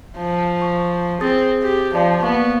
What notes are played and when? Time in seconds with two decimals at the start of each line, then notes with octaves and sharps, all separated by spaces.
0.18 F3
0.62 C#6
1.21 C4 G#4 D#6 A6
1.63 G4
1.94 F3 D5 A5
2.23 A#3 B3 F5 C#6